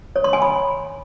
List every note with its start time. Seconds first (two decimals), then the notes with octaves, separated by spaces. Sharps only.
0.16 C#5
0.24 C6
0.33 G#5
0.42 B5